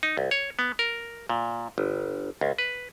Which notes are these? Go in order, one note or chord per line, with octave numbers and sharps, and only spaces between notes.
D#4
C2
C#5
B3
A#4
A#2
G1
C#2
B4